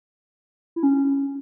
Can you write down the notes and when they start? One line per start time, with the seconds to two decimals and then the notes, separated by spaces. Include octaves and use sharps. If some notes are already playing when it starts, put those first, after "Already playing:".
0.76 E4
0.83 C#4